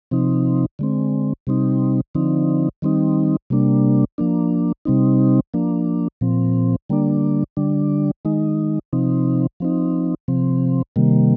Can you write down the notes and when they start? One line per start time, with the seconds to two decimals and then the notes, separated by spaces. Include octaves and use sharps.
0.11 C3 F3 C4 D#4
0.79 D3 G#3 C4
1.47 C3 G3 C4 D#4
2.15 D3 F3 C4 D#4
2.82 D#3 G3 C4 D#4
3.50 C3 G3 A#3 D4
4.18 F3 A#3 D4
4.85 C3 G3 C4 D#4
5.54 F3 A#3 D4
6.21 A#2 F3 C4
6.90 D3 G3 A#3 D4
7.57 D3 G3 D4
8.25 D#3 G#3 D#4
8.93 C3 F3 C4 D#4
9.60 F3 C4 D#4
10.28 C3 F3 C4
10.96 C3 D#3 G3 A#3